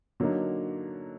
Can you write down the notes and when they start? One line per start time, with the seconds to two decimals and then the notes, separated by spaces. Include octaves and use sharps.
0.20 D3 F#3 A#3 D#4